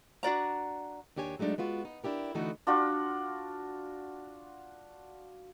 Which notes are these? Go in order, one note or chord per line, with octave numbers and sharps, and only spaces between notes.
D4 F#4 D5 A#5
D#2 D4 G4 C#5 G#5
F#3 G#3 A3 D4 D#4
G#3 B3 F4 F#4
D#4
D4 E4 G4 A#4
D3 E3 A3 B3 D#4 F#4
D4 F4 F#4 D5